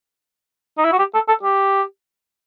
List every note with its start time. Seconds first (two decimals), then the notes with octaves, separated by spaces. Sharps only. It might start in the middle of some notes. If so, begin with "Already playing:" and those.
0.78 D#4
0.85 E4
0.92 F#4
0.99 G4
1.14 A4
1.28 A4
1.43 G4